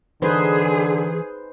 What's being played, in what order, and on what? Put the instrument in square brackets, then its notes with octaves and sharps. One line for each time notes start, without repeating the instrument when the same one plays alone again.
[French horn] D3 [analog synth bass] E3 [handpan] D#4 B4 C5 [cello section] G#4